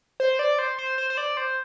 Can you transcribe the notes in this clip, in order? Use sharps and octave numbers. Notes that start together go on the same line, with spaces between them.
C5
D5
C5
C5
C5
C5
D5
C5